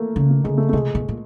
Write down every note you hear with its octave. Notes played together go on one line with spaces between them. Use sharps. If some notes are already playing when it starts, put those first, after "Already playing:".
Already playing: A3 A#3
C#3
A3
C#3 G#3
A3
A3
C3 G#3
B2
A#2